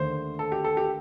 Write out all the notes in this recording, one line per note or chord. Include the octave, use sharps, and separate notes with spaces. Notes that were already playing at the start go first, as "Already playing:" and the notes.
Already playing: D#2 D3 A3 C5
A4
G4
A4
G4